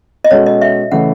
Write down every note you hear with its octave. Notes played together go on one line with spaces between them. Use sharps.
D#5
B2 G#3 C#4 F#4 A4 C#5
D#5
E5
C#3 E3 A3 F#5